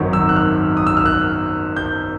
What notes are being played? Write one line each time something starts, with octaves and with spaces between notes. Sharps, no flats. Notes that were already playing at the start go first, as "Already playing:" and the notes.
Already playing: G#1 F#2 D#3 F#3
E6
F#6
F6
D#6
E6
F6
F#6
G6